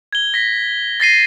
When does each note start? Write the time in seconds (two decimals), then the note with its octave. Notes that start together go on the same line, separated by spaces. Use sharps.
0.13 G#6 G7
0.34 A#6 B6
1.00 A6 A#6 C7 D#7